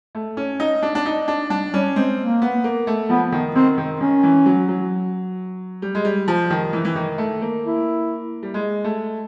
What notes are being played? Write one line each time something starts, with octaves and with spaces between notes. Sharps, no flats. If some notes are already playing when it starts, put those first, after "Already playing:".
A3
C#4
D#4
D4
D4
D#4
D4
G3 D4
G3 C#4
G#3 C4
A#3
B3
A#3
A3
F3 B3
D#3
D#3 C4
D#3
D#3 C#4
E3
F#3
F#3
G3
G#3
G3
F3
D#3
E3
E3
D#3
A3
A#3
E4
G3
G#3
A3